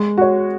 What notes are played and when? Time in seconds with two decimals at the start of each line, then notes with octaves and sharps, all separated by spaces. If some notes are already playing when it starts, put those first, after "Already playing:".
Already playing: G#3
0.18 F#4 C#5